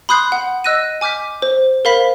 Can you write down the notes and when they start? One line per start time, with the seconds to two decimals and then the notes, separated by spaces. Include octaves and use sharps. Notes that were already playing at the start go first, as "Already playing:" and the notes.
0.09 B5 C6 D#6 F#6 G6 C7
0.32 F#5
0.64 D#5 E6 F#6 A#6 D#7
1.01 G#5 D6 F6 G6 B6
1.42 C5
1.85 A#4 C5 F5 B5 B6